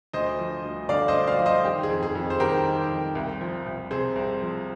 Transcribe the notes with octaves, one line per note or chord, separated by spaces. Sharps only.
D2 C5 D#5
F3
D2
D3 D5 F5
C5 D#5
D2
D5 F5
F3
C5 D#5
D#3 G4
G#4
F2
G#4
F2
C5
D#3 G4 A#4
D#3
F2
C2
F3
C2
C3 G#4 C5
C2
F3